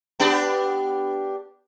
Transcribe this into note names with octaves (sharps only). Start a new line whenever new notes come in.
B3 D4 G4